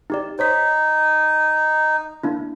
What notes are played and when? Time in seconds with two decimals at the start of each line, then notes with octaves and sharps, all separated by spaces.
0.10 D#4 G4 D5
0.39 D#4 C5 C#5 B6
2.23 A#3 D4 E4